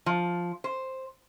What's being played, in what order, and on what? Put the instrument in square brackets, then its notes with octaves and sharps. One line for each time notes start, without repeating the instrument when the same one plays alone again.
[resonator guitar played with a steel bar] F3
C5